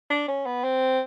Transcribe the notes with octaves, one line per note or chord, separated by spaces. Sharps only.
D4
C#4
B3
C4